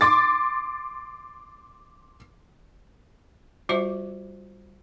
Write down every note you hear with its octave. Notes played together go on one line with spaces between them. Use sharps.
C6 D6 A6
G3 F4 F#4 C5 E5 D6